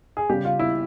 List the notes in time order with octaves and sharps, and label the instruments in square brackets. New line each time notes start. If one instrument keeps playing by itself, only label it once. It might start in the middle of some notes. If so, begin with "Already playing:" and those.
[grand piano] G#4
C#3 G3 G4
F4
E4